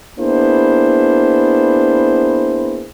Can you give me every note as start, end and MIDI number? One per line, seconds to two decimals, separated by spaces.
0.19 2.86 58
0.19 2.86 59
0.19 2.86 62
0.19 2.86 64
0.19 2.86 68
0.19 2.86 72